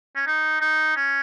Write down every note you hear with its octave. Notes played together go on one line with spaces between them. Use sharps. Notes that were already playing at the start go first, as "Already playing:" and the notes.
C#4
D#4
D#4
C#4